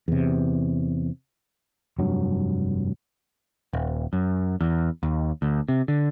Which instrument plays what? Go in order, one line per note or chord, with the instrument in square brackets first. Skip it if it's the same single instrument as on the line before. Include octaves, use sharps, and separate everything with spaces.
[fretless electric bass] E2 C3
F1 G2 F#3
[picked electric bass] D#1
F#2
E2
D#2
D2
C3
D3